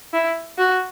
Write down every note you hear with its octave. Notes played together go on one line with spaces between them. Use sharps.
E4
F#4